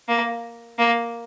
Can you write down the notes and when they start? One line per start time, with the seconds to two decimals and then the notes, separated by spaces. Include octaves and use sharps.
0.08 A#3
0.78 A#3